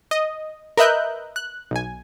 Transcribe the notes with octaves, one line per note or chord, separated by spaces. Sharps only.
D#5
A#4 B4 D#5 E5 F#6 G6
F#6
B1 G#5